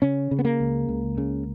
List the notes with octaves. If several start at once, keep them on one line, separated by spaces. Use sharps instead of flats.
C#3 C#4
C#3
B3
A#3
C#2
C#2
C#3